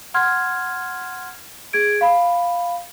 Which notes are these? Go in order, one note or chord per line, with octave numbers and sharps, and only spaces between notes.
F#5 C6 F6 G#6
G#4 G#6 D7
F5 B5